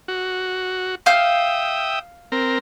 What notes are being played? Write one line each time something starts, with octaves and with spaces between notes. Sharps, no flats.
F#4
E5 F5 G5 D#6 F6 G6
C4 A#4